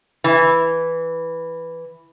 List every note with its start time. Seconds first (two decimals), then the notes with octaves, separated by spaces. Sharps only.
0.24 E3